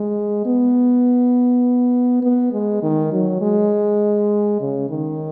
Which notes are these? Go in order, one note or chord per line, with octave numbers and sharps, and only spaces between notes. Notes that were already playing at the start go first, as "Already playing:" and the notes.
Already playing: G#3
B3
B3
G#3
D#3
F#3
G#3
C#3
D#3